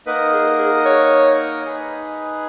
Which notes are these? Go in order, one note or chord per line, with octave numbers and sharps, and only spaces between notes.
A#3 D#4 A#4 B4 D#5 F#5
G#4
G#4
C#5
D#4 G#4 B4